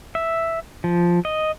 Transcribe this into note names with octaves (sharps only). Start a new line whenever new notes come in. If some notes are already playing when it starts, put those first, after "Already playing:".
E5
F3
D#5